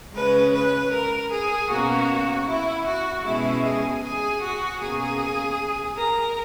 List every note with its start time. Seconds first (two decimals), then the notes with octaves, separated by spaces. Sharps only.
0.14 C#3 G#3 C#4 B4
0.53 B4
0.92 A#4
1.31 G#4
1.70 B2 A#3 C#4 F#4
2.47 E4
2.86 F#4
3.25 B2 G#3 C#4 E4
3.64 G#4
4.03 G#4
4.42 F#4
4.80 B2 A#3 C#4 G#4
5.97 A#4